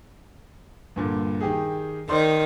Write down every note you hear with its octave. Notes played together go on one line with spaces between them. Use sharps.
G2 A#2 D3
D#3 G4 G#4
D#3 C5 D5 C6